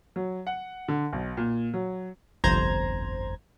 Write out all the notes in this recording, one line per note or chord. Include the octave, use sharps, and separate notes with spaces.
F#3
F#5
D3
B1
A#2
F#3
G1 C2 F2 C5 A#5 G#6